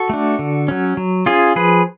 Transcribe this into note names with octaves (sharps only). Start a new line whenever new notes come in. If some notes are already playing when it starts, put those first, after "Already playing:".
Already playing: F#4 A4
A3 D4
D3
F#3 C#4
F#3
C#4 F4 G#4
F3 G#4 B4